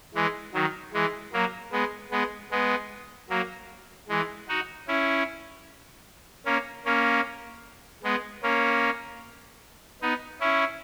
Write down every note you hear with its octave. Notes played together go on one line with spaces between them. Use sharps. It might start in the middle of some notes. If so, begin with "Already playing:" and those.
E3 G#3
D#3 F#3
E3 G#3
F#3 A#3
G#3 B3
G#3 B3
G#3 B3
F#3 A#3
E3 G#3
D#4 F#4
C#4 E4
A#3 C#4
A#3 C#4
G#3 B3
A#3 C#4
B3 D#4
C#4 E4